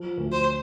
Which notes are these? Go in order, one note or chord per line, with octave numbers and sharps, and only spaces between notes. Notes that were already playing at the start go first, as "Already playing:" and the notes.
Already playing: F3
D2
C5